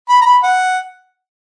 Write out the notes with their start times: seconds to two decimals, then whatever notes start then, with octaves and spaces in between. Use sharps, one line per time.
0.09 B5
0.22 A#5
0.26 B5
0.43 F#5